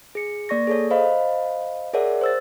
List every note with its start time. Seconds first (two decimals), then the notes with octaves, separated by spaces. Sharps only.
0.15 G#4 C#7
0.49 A#3 D5 C#6 A#6
0.67 G#4 A4 C#5
0.90 C5 D#5 F5 B5
1.94 G#4 A#4 C#5 D5 E5 F#5
2.21 C5 E6 A6